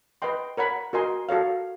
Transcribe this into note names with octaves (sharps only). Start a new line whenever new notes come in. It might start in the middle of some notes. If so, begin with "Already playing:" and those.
B4 D#5 G5 C6
A#4 C#5 F#5 B5
F#4 A#4 D#5 G#5 C6
F#4 A4 C#5 F5